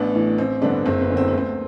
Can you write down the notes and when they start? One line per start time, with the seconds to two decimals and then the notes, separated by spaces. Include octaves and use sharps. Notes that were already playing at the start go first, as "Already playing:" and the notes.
Already playing: A1 B3 D4
0.14 A2 E3
0.38 A1 C4
0.62 G2 D3 B3 D4
0.86 F#1 C4
1.01 B3
1.09 E2 D3
1.17 C4
1.28 D2 B3
1.38 C4